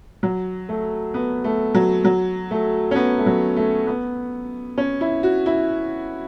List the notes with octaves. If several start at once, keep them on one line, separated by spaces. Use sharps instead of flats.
F#3
A3
B3
A3
F#3
F#3
A3
C#4
B3
A3
F#3
A3
B3
C#4
E4
F#4
E4